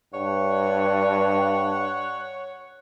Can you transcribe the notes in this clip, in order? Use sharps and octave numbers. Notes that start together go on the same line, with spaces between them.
G2 C#5 F#5